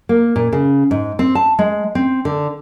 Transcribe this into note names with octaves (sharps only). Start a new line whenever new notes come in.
A#3
A#2
C#3
G#2
C4
A5
G#3
C4
D3